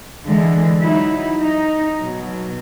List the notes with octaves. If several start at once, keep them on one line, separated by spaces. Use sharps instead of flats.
D3 E3 G#3
F#3 D#4 E4
D#4
B2 F#3